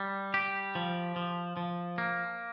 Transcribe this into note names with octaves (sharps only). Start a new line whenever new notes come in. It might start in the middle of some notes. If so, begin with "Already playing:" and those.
Already playing: G3
G4
F3
F3
F3
A#3